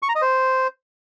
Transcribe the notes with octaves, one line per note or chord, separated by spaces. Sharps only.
C#6
A#5
D#5
C5